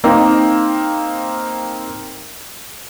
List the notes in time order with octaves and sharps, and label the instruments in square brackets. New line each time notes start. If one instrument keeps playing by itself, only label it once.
[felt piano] A#3 C4 D#4